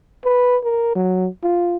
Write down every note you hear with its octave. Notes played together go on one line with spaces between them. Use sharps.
B4
A#4
F#3
F4